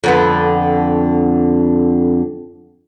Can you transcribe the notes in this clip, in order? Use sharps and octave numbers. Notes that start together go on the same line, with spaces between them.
F2 D3 B3